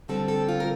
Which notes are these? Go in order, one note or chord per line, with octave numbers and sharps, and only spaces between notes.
D2 D3 G3 C4 A4
A4
F4
A#4